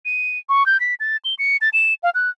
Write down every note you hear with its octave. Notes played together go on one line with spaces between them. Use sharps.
D#7
C#6
G6
B6
A6
G7
C#7
A6
E7
F5
F#6